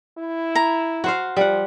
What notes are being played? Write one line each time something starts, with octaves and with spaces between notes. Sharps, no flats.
E4
A#5
F#4 C5 F5
F3 G3 F#5